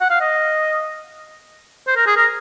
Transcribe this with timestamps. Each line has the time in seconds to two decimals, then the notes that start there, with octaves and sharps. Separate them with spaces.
0.01 F#5
0.10 F5
0.20 D#5
1.87 C5
1.96 A#4
2.06 G#4
2.17 A#4